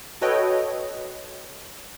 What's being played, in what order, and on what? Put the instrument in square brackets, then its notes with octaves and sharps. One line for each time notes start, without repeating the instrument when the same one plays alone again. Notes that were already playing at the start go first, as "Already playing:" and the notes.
[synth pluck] F#4 A4 B4 C#5 D#5 G5